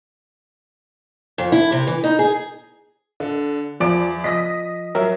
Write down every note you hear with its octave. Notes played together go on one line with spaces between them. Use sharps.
F2
E4
C3
E3
D#4
G#4
D3
E2 F3 D5 D7
F3 D#5 D#6 A#6 B6
F#3 A#4 E5